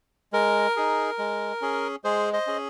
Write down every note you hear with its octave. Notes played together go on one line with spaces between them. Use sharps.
G#3 A#4
D#4 G#4
G#3
C#4 G#4
G#3 G#4 C5
C5 D#5
C#4 G#4